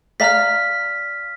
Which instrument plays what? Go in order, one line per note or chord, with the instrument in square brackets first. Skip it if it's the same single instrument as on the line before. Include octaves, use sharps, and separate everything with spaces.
[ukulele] D5 F5 A#5 [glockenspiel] F6 B6